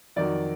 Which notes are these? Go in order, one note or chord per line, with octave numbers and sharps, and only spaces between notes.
F2 D#3 F#3 D5